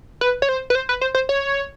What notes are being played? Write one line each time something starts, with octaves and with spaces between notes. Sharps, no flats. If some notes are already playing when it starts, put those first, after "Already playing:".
B4
C#5
C5
B4
C5
B4
C5
C5
C#5